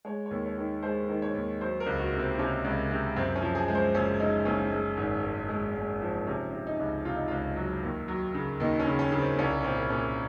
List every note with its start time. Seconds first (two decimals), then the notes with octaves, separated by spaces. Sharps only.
0.05 G#3 C#5
0.26 D#2 C#5
0.46 C#5
0.58 D#3
0.83 G#3 C5
1.09 D#3
1.22 C#5
1.35 D#2
1.61 F#3 C5
1.80 A#4
1.86 C#2
1.99 F#4
2.13 C3
2.19 C4
2.39 C3 C#4
2.64 C#2
2.91 C3
3.16 F#2 C4
3.36 C#4
3.42 F3
3.55 G#4
3.68 G#3
3.75 C5
3.94 F#1 C#4
4.20 G#3 D#4
4.45 F#1 C#4
4.72 G#3
4.97 G#1
5.23 G#3
5.49 G#3
5.76 G#3
6.02 F3
6.27 C3 C#4
6.53 C3
6.67 D#4
6.79 C#2
7.05 C3 F4
7.16 D#4
7.28 C#2 F4
7.56 F#3
7.83 D#2
8.08 F#3
8.34 C#3
8.60 D#2 D#4
8.79 C#4
8.86 C#3
8.99 C#4
9.12 C#3
9.19 C4
9.39 C2 C#4
9.64 A#2 C4
9.89 A#2 C#4